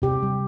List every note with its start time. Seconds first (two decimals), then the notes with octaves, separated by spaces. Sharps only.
0.02 C3 G4
0.23 G3